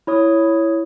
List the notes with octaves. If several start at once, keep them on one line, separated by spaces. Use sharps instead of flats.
E4 C#5 D#6